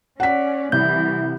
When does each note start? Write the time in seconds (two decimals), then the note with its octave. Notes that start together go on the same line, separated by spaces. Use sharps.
0.20 C#4 D5 F#5 B6
0.72 C2 E3 G6